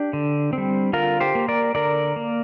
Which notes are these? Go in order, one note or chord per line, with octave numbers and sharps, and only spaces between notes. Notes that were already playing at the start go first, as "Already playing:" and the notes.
Already playing: D4 G4
D3
C4
G3
D3 F4 A#4
G4 C5
A#3
A#4 D5
D3 A#4 D5
A#3